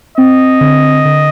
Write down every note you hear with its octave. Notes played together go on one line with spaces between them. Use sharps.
C4 D#5
D3
D3